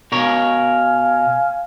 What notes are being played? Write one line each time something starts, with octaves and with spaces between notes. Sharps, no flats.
B2 A#4 C#5 F5 G#5